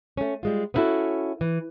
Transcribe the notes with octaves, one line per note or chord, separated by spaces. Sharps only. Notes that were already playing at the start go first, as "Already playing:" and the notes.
A3 C#4
G3 G#3 F4
B3 C#4 D4 E4 F#4 A4
E3